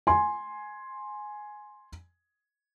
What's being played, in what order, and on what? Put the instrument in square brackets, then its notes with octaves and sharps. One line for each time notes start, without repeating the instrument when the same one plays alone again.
[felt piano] G#5 C6